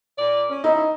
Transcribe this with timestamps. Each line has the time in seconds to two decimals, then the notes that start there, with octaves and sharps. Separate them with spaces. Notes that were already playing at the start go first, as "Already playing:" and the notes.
0.19 A#2 D5
0.50 C#4
0.64 D#4 E4